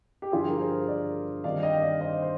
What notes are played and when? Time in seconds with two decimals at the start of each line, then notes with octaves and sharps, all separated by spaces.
0.22 G4
0.32 G2 D3 F3 F4 G#4
0.49 A#4
0.60 G#4 C5
0.88 A#4 D5
1.44 G2 D#3 G3 C4 D#4 D5 F5
1.63 D#5 G5
1.82 D5 F5
2.01 C5 D#5
2.22 C5